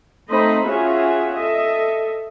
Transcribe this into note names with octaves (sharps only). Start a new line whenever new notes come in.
A3 C4 D#4 C5 D#5 B5
C#4 F4 F#4 G#4 E5
A4 D#5 E5